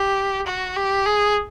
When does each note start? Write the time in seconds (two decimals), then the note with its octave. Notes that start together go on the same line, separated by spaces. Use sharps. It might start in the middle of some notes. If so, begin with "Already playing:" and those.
Already playing: G4
0.47 F#4
0.76 G4
1.06 G#4